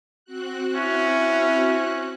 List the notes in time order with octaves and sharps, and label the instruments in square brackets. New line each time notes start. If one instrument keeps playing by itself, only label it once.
[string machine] C4 F#4 F#6
[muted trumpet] C#4 [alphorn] E4